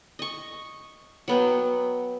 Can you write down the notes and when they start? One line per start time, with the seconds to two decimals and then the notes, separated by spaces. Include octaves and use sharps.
0.19 D#5 C#6
1.28 F#3 B3 G5